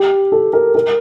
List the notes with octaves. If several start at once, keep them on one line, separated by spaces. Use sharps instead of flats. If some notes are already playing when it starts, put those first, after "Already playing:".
Already playing: G4
A4
A#4
A#4